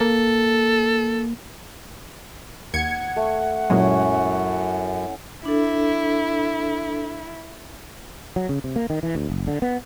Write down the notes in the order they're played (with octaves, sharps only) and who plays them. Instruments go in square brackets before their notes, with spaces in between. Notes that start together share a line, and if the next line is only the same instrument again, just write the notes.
[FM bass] A#3 [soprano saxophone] A4
[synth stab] D#2 G#6 C#7 [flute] F#5
[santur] A3
[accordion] F#2 [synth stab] A#2 F#3 G#3 [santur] C#4 E4
[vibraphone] D4 A4 [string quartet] E4
[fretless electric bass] F#3
C#3
C3
A#3
D#3
E3
D2
F#1
D3
B3